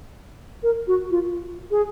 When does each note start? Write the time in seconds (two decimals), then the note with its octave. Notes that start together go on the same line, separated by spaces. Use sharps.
0.63 A#4
0.87 F#4
1.11 F4
1.71 G#4